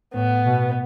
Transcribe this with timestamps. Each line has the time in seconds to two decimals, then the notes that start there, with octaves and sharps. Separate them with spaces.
0.14 A2 B3
0.46 B2